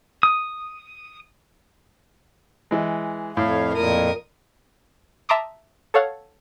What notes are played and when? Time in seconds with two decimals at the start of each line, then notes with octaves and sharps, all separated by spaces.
0.23 D#6
2.71 E3 G#3
3.37 F2 A2 C#5 F5
3.74 F2 A#2 A#4 D#6
5.29 E5 A5 A#5 C6 D6 D#6
5.94 A4 C#5 F5 F#5